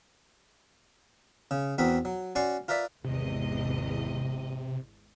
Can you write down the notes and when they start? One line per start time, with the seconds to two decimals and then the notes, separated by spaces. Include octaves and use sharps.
1.51 C#3
1.78 E2 C4 F#4 A#4 B5
2.05 F#3
2.35 C#4 F#4 D5 C6 C#6
2.68 F4 A#4 B4 D5 E5
3.04 G#1 E2 C3 D#5